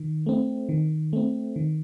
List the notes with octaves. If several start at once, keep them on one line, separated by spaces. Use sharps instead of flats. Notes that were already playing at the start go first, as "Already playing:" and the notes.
Already playing: D#3
A3 C4
D#3
A3 C4
D#3